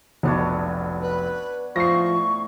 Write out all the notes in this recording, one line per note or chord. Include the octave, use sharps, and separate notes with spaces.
F1 B1 B3 D4 C#5
B4
A2 F3 C#6 A#6 C7